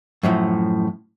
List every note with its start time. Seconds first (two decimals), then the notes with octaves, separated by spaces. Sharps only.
0.23 F#2 A2 F3